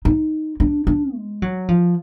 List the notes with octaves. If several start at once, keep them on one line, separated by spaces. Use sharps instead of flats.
D#4
D4
D4
G#3
F#3
F3